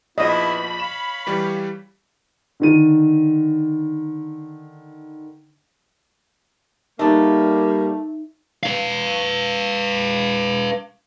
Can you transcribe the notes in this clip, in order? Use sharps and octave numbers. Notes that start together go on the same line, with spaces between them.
A#1 F3 B3 E4 F#4 D#5 B5
C#5 F5 E7
E3 G3 G4
D3 D#3 D#7
G3 A3 A#3 D4 D#4
B4 F5